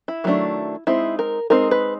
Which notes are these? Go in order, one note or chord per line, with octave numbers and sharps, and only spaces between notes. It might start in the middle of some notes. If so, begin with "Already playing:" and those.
E4
D#3 F#3 A3 D4
G#3 C4 D#4 E4
A#4
G#3 C4 D#4 A#4
B4